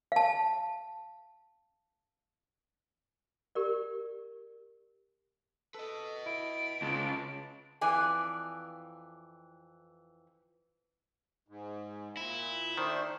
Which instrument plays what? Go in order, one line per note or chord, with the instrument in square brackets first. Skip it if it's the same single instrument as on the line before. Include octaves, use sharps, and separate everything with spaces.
[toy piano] F5 A5
G4 A#4 D5
[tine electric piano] A4 [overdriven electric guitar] B4 D#5
[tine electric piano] E4 [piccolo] D7
[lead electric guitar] C#2 [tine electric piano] A5
[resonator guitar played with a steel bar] F2 E3 D5 G#5
[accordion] G#2
[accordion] A#2 [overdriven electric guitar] E4
[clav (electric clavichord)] D#3 [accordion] A3 D4 C5